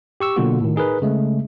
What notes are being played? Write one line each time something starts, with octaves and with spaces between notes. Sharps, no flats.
G4 C#6 E6
B2 D3 F#3 A#3 F4 F#4
A2 D#3
D#4 G#4 A#4 B4
C#3 G#3 A3